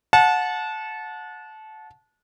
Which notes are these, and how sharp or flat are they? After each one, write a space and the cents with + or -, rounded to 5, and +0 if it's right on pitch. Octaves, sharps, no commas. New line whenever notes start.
F#5 -30 A5 -20